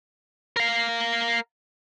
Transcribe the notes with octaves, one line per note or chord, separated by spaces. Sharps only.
A#4 F5